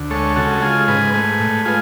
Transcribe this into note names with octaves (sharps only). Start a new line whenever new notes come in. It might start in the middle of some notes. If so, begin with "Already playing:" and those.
Already playing: D2
G#3 A4 C#5
C#3 F#4 A4
G#3 F4 G#4
G#2 G#4 B4
A3 G#4 B4
A2
G#3 F4 G#4